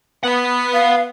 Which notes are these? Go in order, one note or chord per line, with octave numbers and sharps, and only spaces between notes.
B3 F#5 B5
F5